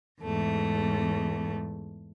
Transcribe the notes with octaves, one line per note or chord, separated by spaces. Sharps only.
E2 G#2 A3